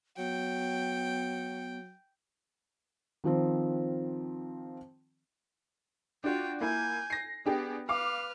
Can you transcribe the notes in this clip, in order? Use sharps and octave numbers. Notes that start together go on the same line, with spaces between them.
F#3 B3 G5
D#3 F3 C4
D4 F4 F#4 G5
A#3 E4 G#5 G6
A#6 C7
B3 D4 G4 G#4
B4 F5 D6 F6